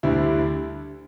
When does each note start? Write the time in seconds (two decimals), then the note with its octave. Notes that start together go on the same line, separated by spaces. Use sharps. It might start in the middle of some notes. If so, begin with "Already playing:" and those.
0.03 D2 D3 G3 E4